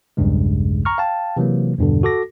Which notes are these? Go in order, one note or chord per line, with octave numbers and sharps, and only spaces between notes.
B1 E2 G2 C#3 G#3
A#5 C#6 F6
F5 G5 A5
C3 E3 F#3 A#3
E2 G2 B2 D3
F#4 A4 D6 A#6